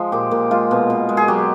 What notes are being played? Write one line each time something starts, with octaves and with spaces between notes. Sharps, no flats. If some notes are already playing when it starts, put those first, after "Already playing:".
Already playing: F3 G#3
A#2 G4
A#2
G#3 F4
B2
B2
G#3
G#4
F#3 G4